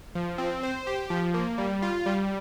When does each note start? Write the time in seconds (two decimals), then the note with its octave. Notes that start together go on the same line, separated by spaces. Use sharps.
0.15 F3
0.38 C4
0.63 C5
0.87 G4
1.10 F3
1.34 A#3
1.58 G3
1.82 F4
2.06 G3